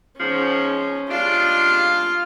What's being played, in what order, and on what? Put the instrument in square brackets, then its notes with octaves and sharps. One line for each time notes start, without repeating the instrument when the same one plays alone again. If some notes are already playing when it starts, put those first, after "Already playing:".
[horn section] G#2 F3 [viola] C#4
[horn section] G3 G#3 D4 [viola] F4 F5